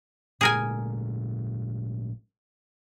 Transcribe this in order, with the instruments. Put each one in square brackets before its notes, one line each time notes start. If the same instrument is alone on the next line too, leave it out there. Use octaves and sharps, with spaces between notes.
[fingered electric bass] G#1 A#2 G#3 [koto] G#4 A#4 G#5